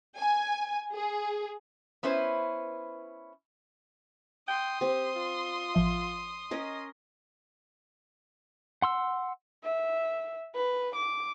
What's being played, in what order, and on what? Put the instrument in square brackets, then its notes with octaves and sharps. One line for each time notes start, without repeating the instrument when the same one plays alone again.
[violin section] G#5
G#4
[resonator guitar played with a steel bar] B3 C#4 E4 B4 C5
[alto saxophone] G5 [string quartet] C6 D#6
[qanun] C4 [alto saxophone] G4
[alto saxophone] F4
[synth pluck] A1 F3 E5
[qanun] C#4 A#4 [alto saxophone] D#5
[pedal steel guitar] F#5 C6 E6
[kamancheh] E5
B4
D6